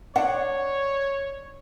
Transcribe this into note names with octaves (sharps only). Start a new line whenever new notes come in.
D4 C#5 F#5